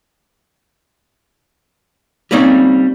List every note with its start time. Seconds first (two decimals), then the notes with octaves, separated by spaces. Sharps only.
2.31 G3 A#3 C4 C#4 D#4